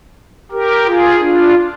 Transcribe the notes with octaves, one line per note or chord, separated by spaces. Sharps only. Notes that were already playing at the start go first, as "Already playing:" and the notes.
G4 A#4
F4 G#4
D4 F4